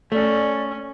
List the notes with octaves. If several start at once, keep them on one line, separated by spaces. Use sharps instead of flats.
A3 C#4 D5